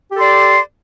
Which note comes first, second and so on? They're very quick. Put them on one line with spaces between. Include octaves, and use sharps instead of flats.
G4 A4 C6 D5